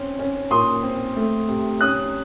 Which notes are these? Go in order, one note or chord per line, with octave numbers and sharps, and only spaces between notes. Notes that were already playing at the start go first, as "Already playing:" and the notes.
Already playing: C4 C#4
C#4
A#2 C6 D#6
C4
A3
C3
C#4 D#6 F#6